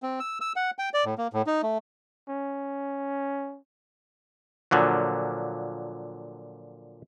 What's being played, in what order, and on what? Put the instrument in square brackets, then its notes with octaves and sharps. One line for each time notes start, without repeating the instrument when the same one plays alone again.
[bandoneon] C4
E6
E6
F#5
G5
D5
A2
A#3
A2
D#4
A3
[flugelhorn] C#4
[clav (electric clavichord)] A#2 D3 F3 F#3